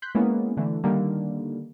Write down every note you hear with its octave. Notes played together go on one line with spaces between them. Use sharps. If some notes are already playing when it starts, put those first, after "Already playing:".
C6 F#6 G6 B6
G#3 A#3 B3 C#4 E4
D3 E3 A3
D3 D#3 G3 A#3